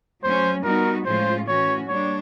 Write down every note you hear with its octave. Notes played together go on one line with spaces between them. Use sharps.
F#3 A3 C#4 C5
G3 B3 D#4 F#4 A#4
A2 F3 G#3 C#4 F4 C5
E3 A3 C#4 F#4 C#5
G3 A#3 D4 C#5